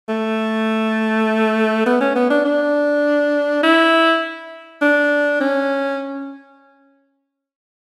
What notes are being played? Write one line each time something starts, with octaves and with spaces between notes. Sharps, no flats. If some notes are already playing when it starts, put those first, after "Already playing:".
A3
B3
C#4
B3
D4
D4
E4
D4
C#4